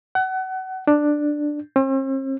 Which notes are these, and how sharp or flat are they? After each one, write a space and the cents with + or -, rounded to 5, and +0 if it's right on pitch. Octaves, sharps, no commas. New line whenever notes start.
F#5 +30
D4 +10
C4 +45